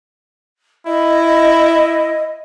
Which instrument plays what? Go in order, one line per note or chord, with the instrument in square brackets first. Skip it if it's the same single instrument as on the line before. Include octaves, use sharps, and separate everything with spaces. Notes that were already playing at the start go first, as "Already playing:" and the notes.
[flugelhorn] E4 [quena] D#5